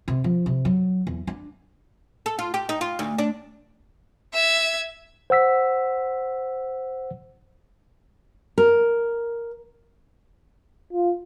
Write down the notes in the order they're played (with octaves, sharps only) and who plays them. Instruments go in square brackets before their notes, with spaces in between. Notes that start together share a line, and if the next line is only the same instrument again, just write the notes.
[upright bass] C3
F3
C3
F#3
E2
D4
[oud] A4
F4
G4
D#4
F4
D2
D4
[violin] E5 G#6
[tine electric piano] C5 F#5 E6 B6
[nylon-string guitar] A#4
[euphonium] F4